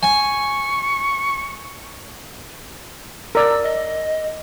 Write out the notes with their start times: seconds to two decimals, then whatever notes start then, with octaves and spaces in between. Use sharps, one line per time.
0.03 G#5 C#6
3.35 A#4 D5 E6
3.64 D#5